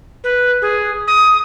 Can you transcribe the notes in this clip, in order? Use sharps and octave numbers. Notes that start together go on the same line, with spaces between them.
B4
G#4
D#6